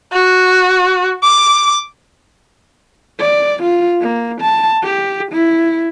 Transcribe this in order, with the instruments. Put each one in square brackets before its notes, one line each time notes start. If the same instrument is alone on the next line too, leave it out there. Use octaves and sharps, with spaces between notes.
[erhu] F#4
D6
[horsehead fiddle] D5
F4
A#3
A5
G4
E4